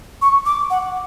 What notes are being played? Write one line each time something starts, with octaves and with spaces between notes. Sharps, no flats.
C#6
D6
F#5